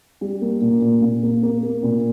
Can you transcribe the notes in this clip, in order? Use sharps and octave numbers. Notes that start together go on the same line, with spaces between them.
G3
A#3
A#2
A#2
A#2
A#3
A#3
A#3
A#2